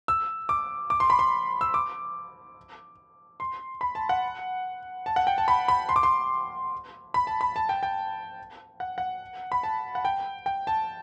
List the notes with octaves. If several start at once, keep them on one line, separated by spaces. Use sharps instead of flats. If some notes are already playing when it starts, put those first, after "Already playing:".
E6
D6
D6
C6
B5
C6
E6
D6
C6
B5
A5
F#5
A5
F#5
G5
A5
B5
B5
C6
D6
C6
B5
A5
B5
A5
G5
G5
F#5
F#5
B5
A5
F#5
G5
G5
A5